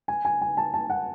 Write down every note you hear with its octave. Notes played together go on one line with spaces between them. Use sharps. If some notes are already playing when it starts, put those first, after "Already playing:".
G#5
G#5
G#5
A5
A5
F#5